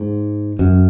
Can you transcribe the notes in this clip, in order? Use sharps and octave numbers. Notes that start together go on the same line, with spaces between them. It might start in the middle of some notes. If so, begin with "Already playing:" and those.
Already playing: G#2
F#2